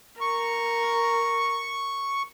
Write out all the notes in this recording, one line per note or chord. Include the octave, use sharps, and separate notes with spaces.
A#4 C#6